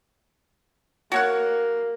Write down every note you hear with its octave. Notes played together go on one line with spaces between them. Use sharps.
A#3 F#4 C#5 F#5